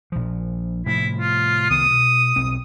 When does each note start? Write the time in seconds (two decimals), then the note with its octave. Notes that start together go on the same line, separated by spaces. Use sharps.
0.12 A#1 F3
0.86 A2 C3 F3 E4
1.18 F4
1.70 C2 D#3 B3 D#6
1.91 B2
2.36 B1 C4